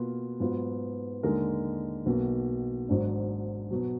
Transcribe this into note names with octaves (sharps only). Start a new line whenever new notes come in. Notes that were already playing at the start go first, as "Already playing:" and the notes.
Already playing: B2 A#3 F4 B4
G#2 F#3 B3 F4
D#2 D3 G#3 D#4 A#4
B1 B2 A#3
G#1 G#2 F#3 D4
B2 F#3